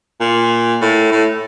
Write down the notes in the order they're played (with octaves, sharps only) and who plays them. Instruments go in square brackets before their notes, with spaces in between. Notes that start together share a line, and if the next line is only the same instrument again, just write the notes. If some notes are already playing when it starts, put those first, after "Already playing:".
[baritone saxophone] A#2
A2
A2